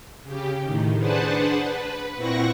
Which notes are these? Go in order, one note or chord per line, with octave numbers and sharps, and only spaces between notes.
C#3 G4
A2 D#3
D4 G#4 B4 C5 F#5 A5
B4
A#2 C4 E4 F#5 C#6 A#6